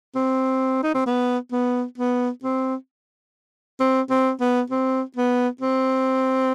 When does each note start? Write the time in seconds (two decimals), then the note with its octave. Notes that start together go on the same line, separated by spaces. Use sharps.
0.15 C4
0.83 D#4
0.94 C4
1.06 B3
1.52 B3
1.98 B3
2.43 C4
3.80 C4
4.10 C4
4.40 B3
4.70 C4
5.16 B3
5.61 C4